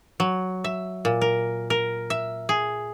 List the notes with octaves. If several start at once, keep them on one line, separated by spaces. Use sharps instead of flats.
F#3
E5
A#2
A#4
A#4
E5
G#4